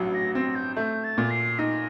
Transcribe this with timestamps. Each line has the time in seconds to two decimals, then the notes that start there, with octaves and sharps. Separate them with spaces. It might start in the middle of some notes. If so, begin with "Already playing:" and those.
Already playing: A1 G2 F#3
0.14 A#6
0.35 C4 A#6
0.55 G6
0.76 A3 G6
1.04 A6
1.18 A#2
1.31 C7
1.59 D#4 A#6